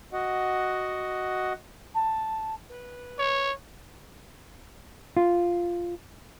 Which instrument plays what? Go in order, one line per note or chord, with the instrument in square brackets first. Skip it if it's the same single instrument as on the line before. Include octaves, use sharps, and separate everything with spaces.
[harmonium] F#4 D#5 F#5
[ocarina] A5
B4
[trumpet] C#5
[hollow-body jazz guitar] F4